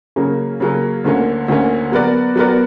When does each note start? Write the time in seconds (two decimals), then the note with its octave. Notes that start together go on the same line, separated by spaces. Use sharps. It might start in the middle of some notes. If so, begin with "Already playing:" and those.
0.16 C#3 F#3 A#3 C#4
0.60 C#3 F#3 A#3 C#4
1.04 D2 D3 A#3 C#4
1.48 D2 D3 A#3 C#4
1.92 F#3 B3 F#4 A#4 D5
2.36 F#3 B3 F#4 A#4 D5